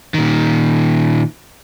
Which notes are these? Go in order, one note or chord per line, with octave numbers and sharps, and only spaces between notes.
A#2 D#3